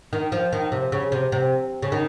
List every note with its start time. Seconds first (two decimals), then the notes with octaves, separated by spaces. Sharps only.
0.13 D#3
0.32 F3
0.52 D#3
0.72 C3
0.92 C#3
1.12 C3
1.32 C3
1.83 C#3
1.92 D#3